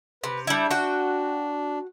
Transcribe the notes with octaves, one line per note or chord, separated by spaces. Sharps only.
C3 B4
G3 D4 E4
F#4 G5